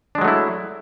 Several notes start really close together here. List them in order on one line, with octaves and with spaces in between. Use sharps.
D4 G#3 F#3 A3 E4